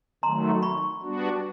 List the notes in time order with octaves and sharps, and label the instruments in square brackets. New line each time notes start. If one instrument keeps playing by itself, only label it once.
[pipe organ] D#3 F#3 A3 [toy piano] A#5 C6
[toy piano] B5 C#6
[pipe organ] G3 B3 D4 F#4